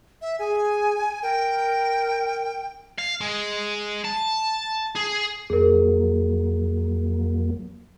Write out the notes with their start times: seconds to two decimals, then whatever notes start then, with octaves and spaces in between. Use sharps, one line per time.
0.22 E5
0.39 G#4 G#5
1.23 A#4 G5
2.98 F5
3.21 G#3
4.05 A5
4.96 G#4
5.50 F2 F#3 A#3 G#4 A#4